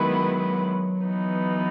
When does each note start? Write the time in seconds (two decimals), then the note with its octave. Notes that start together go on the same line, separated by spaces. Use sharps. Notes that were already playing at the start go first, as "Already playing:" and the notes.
Already playing: D#3 F#3 G#3 B3 E4 B4
1.03 E3 B3 D#4